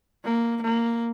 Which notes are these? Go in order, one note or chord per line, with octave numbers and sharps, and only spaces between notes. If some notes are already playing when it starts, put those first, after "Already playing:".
A#3
A#3